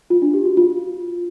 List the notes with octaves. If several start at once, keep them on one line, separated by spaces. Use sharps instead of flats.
F4
D4
G4
F#4
F4